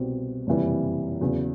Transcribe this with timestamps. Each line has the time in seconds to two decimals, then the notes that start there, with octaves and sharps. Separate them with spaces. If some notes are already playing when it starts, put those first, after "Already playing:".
Already playing: C2 B2 G3 C4
0.47 F#1 F2 C3 E3 G3
1.21 E2 C#3 F#3